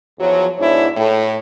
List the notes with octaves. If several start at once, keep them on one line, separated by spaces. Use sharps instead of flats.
E2 F3 F#3
G#2 B2 D4 E4 C#5
A2